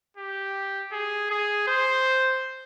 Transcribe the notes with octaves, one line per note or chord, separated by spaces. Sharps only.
G4
G#4
G#4
C5